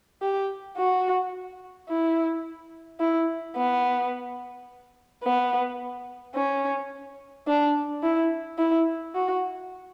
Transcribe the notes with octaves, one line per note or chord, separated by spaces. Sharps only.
G4
F#4
E4
E4
B3
B3
C#4
D4
E4
E4
F#4